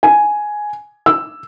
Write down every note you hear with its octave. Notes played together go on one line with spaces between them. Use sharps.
G#5
E6